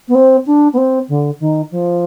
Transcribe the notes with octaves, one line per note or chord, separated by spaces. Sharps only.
B3
C4
D4
B3
C4
D3
D#3
F3